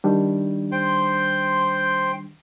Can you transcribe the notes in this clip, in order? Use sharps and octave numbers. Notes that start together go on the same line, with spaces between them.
D#3 G3 D4
C5 G5 C6